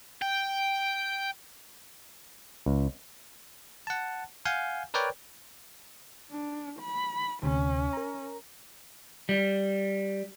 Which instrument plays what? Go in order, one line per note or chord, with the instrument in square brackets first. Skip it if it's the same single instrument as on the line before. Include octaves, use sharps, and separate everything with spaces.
[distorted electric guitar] G5
[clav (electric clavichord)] C#2
[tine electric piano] F#5 A5
F5 F#5 G#5 G6
A#4 B4 C#5 D5 G5
[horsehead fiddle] D4
B5
[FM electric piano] D2 C3 [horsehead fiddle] C#4
[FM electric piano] A#4 A#5
[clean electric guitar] G3